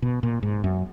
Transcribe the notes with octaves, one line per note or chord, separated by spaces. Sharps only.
B2
A#2
G#2
F#2